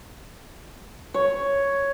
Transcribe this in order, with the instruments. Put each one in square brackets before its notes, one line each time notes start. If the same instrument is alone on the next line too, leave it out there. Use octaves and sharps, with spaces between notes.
[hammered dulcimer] C#5